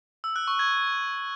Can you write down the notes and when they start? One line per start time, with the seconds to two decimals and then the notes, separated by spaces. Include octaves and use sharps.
0.24 E6
0.36 F#6
0.48 C#6
0.59 G#6